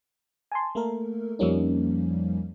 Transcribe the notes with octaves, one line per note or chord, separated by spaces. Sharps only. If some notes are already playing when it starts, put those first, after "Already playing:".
G#5 A5 C6
A3 A#3 A4 A#4
F2 F3 G3 A#3 C#4 D#4